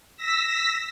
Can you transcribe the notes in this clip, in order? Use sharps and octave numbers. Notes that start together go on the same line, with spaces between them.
E6 A#6 B6